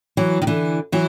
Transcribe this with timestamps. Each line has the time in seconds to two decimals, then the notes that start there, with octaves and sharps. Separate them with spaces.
0.17 E3 F#3
0.42 D#3
0.47 D3 E3
0.92 E3 F#3